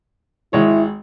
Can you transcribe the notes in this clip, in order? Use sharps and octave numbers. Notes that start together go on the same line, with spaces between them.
G#1 G#3 E4 C#5